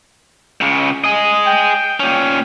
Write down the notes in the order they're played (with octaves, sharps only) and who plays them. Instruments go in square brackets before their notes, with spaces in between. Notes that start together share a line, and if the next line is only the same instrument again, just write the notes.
[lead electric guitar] C#2 C#3
G#4 D#5
[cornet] G5
[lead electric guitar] A#2 C#4